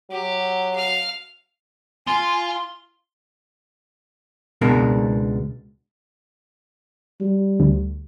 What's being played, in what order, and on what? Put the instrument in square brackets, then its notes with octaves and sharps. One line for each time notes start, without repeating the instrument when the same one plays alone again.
[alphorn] F#3 [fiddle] G4
[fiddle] F5 F6
[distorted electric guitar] F4 [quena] G#5 [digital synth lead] C6
[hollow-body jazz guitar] C#2 B2 G#3 D4 A#4
[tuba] G3
[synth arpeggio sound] D2